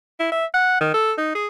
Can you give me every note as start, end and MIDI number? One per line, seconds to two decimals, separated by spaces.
0.19 0.27 64
0.32 0.45 76
0.54 0.77 78
0.81 0.90 51
0.94 1.13 69
1.18 1.30 63
1.35 1.47 68